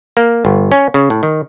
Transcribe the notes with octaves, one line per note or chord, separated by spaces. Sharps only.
A#3
G1
C#4
C#3
A2
D#3